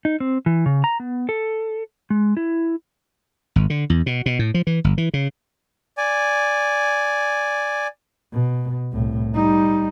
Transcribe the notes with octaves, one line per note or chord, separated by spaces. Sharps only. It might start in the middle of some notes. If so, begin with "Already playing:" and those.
D#4
C4
E3
C#3
A#5
B3
A4
G#3
E4
G#1
D3
E2
B2
B2
A2
F3
E3
G1
E3
C#3
D5 G#5
B2
C2 A2
G3 D#4